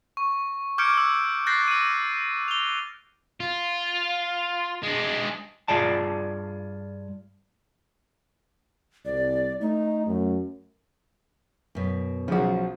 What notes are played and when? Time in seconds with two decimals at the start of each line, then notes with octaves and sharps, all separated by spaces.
0.17 C#6
0.78 D6 F6 G6 G#6 C#7 D7
0.94 E6 F6
1.46 F#6 G6 A6 A#6 C7
1.68 E6 D#7
2.48 F7 G7
3.40 F4
4.83 G#3 D4
5.68 G2 F4 G#4 D5 A5
9.05 C2 D5
9.61 A3 D#4
10.07 F#2
11.75 F#2 B2
12.28 B1 C#3 F3 F#4